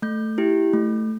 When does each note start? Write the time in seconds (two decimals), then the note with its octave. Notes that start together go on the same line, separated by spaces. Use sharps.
0.02 A3 G6
0.38 E4 G4
0.74 A3